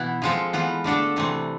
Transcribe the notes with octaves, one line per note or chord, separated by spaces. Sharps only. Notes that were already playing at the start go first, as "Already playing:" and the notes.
Already playing: B2 E3 B3 E4
F3 G#3 C4 F4 A4
E3 B3 F4
D3 A3 D4 A4
C3 E3 A3 C4